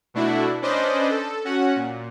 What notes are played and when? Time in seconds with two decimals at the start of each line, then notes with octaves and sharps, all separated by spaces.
0.14 B2 A3 D4 E4 F#4
0.62 C#4 D4 B4 C5 D5 D#5
1.10 A4
1.45 C#4 F#4 F#5
1.76 A#2